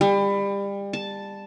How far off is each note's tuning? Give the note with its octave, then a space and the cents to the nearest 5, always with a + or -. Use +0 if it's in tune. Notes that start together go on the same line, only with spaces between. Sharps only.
G3 +30
A5 +0